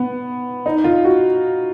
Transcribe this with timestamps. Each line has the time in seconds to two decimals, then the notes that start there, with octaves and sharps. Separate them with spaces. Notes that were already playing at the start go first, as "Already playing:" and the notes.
Already playing: B3
0.66 D#4
0.84 F4
1.05 F#4